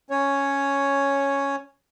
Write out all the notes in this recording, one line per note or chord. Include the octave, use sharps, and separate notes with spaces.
C#4 C#5